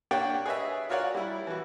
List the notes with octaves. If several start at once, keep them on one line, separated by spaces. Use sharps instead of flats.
A#3 D4 G4 C#5 F#5 G5
G#4 B4 C#5 D#5 E5
F4 F#4 A#4 C#5 D5 F#5
G3 E4
E3 F#4